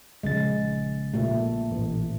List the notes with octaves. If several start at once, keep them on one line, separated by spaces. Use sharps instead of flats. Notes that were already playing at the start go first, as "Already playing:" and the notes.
A#1 C#3 G#3 A6
A#2 A3
A1